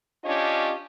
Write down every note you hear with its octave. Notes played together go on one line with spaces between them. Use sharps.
C#4 D4 F4 G4 C#5 D#5